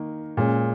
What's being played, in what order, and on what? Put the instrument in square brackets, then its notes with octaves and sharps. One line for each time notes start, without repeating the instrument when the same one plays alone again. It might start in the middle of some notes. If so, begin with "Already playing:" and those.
Already playing: [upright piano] D#3 A#3
A#2 G#3 C#4